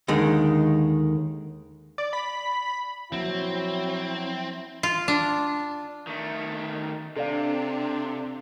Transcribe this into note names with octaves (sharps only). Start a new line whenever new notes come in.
D#2 D3 D#3 G#3
D5
B5
F3 F#3 A#3 C4 E4
F4
D4
D#3 A3
C3 D4 A4 D5 F5